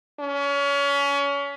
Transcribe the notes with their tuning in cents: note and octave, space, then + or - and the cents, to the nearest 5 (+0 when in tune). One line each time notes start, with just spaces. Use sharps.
C#4 +30